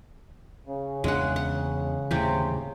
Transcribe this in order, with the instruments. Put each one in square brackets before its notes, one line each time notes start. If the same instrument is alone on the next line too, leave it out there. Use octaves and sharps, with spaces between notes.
[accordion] C#3
[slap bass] E2 C#4 D4 [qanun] G#3 F#5
[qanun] F#5
[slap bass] D#2 A2 E3 [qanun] C3 G4